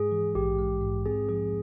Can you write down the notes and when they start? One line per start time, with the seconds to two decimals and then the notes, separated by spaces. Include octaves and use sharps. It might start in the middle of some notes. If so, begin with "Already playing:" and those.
Already playing: G#2 G#3 G#4
0.12 E3
0.35 A#1 G4
0.58 G#3
0.82 G#2
1.05 C4 G#4
1.29 F3 G#4